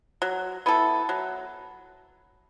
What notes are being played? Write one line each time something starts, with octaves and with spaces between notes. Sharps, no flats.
F#3
B3 E4 A4
F#3